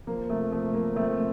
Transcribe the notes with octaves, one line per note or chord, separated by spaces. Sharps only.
F3 A#3
C3 A3
F3 A3
F3 A#3
F3 A3 C4